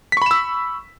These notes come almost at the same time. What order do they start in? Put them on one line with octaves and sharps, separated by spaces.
B6 C#6 B5 E7 E6